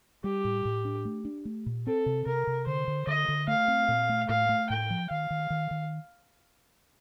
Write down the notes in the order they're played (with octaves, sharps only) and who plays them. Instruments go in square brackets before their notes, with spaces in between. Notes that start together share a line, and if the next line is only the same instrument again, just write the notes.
[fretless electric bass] G3 [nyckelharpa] G4
[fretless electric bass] A2
A2
D4
A3
D4
A3
A#2
[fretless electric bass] C4 [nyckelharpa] A4
[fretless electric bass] C3
[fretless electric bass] C3 [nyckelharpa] A#4
[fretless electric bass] C3
[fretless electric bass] D3 [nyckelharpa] C5
[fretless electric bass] D3
[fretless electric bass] D3 [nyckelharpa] D#5
[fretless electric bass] D3
[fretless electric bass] A3 [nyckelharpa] F5
[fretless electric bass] C4
A#2
A3
[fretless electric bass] A2 [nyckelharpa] F5
[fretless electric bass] A3
[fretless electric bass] A2 [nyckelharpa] G5
[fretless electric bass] F3
[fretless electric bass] D#3 [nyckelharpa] F5
[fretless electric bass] D#3
D#3
D#3